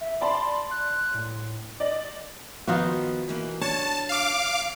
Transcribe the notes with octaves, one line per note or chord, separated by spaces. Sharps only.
E5
D5 A5 B5 C6
F#6
A2
D5 D#5
D#3 F3 B3 D#4 F4 F#4
B2 E3 A#3
D4 C#5 A5
F5 D6